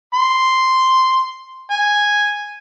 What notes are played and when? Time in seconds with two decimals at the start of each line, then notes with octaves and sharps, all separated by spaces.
0.14 C6
1.71 G#5